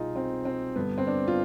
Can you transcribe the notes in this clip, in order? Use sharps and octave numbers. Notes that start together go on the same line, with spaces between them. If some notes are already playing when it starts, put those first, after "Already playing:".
Already playing: C2 B2 D#4 F4 G#4
C4
C4
G2 D3 B3
C4
D4
F4